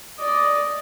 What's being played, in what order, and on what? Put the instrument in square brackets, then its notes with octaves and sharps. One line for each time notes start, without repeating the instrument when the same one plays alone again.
[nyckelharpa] D5 D#5